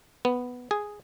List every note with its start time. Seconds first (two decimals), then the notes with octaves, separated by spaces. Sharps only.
0.25 B3
0.71 G#4